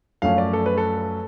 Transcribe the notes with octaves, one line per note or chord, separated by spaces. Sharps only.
F#2 F3 A3 C#4 F5
D5
A4
B4
A4